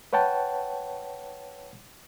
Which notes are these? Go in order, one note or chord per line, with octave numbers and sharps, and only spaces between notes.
B4 C#5 F#5 G5 A5